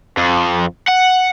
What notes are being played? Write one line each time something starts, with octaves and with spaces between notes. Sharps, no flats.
F2
F#5